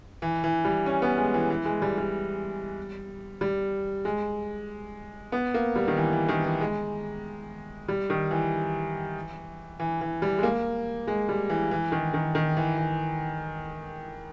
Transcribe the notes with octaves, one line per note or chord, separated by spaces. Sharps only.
E3
E3
G3
C#4
B3
G#3
E3
E3
G#3
G3
G3
G3
G#3
B3
A#3
G3
D#3
E3
E3
D#3
E3
G#3
G3
D#3
E3
E3
E3
G3
G#3
A#3
G#3
G3
E3
E3
D#3
D#3
D#3
E3
E3